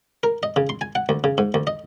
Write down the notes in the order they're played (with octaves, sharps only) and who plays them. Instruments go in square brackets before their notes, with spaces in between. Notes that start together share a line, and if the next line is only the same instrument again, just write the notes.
[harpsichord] A#4
D#5
C#3
C6
G#5
F#5
D2
C#3
G#2
D2
D#5